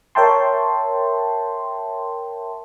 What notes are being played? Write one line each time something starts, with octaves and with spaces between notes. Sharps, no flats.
A#4 C#5 E5 G5 A5 C6